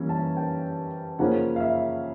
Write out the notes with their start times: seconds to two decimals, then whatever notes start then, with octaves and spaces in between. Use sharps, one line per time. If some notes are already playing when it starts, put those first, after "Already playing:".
Already playing: E3 G3 A#3 C#4
0.09 A5
0.37 G5
1.19 C#3 F3 A#3 C#4 F#5
1.56 F5
1.60 E5